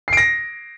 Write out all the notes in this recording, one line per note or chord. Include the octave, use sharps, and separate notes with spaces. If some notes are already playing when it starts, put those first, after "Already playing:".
A#6 C7 D7